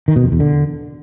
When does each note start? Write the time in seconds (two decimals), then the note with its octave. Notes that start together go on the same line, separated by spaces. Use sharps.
0.08 D#3
0.16 B2
0.24 F2
0.32 E2
0.40 D3